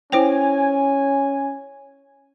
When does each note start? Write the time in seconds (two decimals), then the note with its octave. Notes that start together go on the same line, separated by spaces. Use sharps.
0.12 C#4 E4 C5 G5 G#5